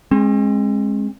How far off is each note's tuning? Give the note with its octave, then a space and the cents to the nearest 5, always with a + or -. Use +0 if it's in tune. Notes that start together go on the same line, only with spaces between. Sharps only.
G#3 +0 C4 +45